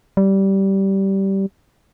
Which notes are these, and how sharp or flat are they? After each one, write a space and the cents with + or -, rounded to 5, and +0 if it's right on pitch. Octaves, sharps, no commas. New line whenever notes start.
G3 -15